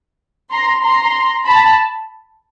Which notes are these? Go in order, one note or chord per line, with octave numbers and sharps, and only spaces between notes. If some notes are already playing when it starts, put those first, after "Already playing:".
A#5 C6
A#5 C6
A5 B5